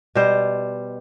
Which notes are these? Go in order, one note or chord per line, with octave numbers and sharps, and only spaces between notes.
B2 G3 C5